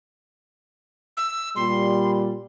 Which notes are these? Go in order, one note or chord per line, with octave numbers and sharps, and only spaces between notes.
E6
A#2 G3 C6